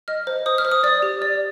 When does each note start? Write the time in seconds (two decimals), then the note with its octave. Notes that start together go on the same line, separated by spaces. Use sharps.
0.08 D#5 F6
0.27 C5
0.46 C5 D#6
0.58 F6
0.65 C5
0.72 D#6
0.83 D5 D#6
1.02 G4
1.22 D5